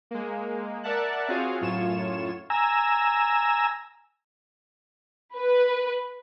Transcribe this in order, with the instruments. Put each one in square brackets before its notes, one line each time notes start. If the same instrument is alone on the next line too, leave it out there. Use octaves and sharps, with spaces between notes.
[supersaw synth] G#3 A#3
A#4 D5 E5 F#5 A5 F#6
C4 F4 F#4 G#4 C#5 F5
F#2 A2 F4 C#5 E7
[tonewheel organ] G#5 A#5 E6
[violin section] B4